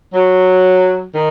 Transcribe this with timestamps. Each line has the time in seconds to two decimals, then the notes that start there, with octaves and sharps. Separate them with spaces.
0.14 F#3
1.15 D#3